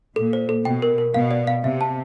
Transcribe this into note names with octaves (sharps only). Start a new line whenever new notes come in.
A#2 A4
C5
A4
B2 G5
A#4
A#4
B2 F5
D5
F5
C3 E5
A5